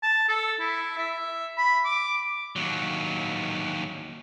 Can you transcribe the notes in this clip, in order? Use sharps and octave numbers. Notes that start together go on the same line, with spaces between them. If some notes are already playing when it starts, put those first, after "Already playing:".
A5
A4
E4
E5
B5
D6
D#2 F#3